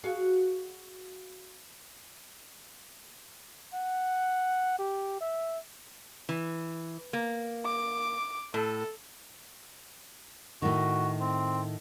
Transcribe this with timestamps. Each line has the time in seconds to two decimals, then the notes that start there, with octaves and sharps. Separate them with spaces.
0.04 F#4 G#4 F5
3.73 F#5
4.79 G4
5.21 E5
6.29 E3
7.13 A#3
7.65 D6
8.54 A2 A4
10.62 A2 D#3 F#4
11.21 C4